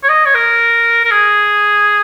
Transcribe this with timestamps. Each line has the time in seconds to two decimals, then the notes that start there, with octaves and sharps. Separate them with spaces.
0.04 C#5
0.09 D#5
0.26 C#5
0.35 A#4
1.05 A#4
1.12 G#4